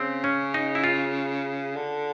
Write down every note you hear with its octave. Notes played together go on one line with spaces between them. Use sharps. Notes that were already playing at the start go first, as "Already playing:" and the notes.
Already playing: C#3 C4
C#4
D#4
E4
F4
D3